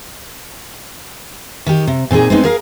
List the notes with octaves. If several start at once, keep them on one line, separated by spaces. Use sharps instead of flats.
D#3 G4
C3
A#2 C4 D#4 G#4
G#3 B3 C4 D#4
G#4 A#4 F5